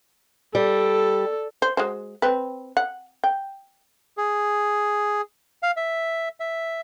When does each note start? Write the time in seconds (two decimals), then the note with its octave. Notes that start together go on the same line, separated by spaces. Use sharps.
0.55 G3 A4
1.62 C5
1.77 G#3 F#4 C5
2.22 C4 B4
2.77 F#5
3.24 G5
4.17 G#4
5.63 F5
5.77 E5
6.40 E5